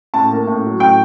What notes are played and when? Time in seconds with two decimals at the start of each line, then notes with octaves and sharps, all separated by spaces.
0.14 A2 A5
0.30 A#3
0.47 A2
0.63 F#3
0.80 A2 G5